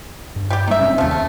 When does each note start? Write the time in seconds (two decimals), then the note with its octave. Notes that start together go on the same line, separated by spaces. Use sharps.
0.36 G2
0.50 G3 G4
0.67 G3 A#3 D#4 E5
0.80 F1 C3 C#4
0.98 D#2 F3 A3 B3
1.11 A3